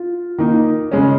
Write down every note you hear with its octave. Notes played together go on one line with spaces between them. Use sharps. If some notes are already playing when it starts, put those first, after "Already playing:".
Already playing: F4
D#3 A#3 D#4
C#3 G#3 C#4